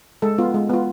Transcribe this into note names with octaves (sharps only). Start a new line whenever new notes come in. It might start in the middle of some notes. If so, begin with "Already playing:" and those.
G#3 A4
B3 F4
G#3
B3 F4